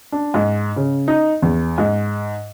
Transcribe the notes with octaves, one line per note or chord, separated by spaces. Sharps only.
D4
G#2
C#3
D#4
E2
G#2